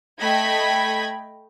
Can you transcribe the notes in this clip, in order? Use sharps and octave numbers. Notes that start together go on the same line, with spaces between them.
A3 D#5 G5 B5 G#6 B6